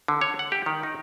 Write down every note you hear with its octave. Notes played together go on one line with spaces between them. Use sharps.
D3
C#5
F#5
G4
D#3
D#4